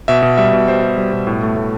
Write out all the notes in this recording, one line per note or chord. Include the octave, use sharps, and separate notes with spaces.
B2 E5
B2
G3 E5
B2
G3 C5
G3
G3
B2
A2
A3
A2